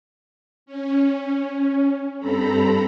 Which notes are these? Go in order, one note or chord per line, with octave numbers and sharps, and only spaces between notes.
C#4
G2 C4 A4 A#5 B5